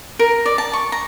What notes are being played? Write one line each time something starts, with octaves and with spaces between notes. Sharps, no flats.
A#4
D5
A5
C#6
A#5